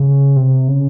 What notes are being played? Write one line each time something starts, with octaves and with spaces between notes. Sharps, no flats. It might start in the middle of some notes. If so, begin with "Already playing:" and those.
Already playing: C#3
C3
C#3